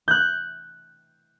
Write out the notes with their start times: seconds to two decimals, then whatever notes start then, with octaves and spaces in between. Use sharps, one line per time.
0.08 F#6 G6